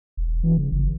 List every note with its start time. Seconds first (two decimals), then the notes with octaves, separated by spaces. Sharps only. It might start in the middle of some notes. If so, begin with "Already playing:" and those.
0.17 E1
0.43 E3
0.57 C#3
0.72 G1